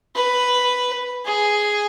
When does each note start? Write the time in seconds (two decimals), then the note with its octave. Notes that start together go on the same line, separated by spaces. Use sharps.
0.15 B4
1.25 G#4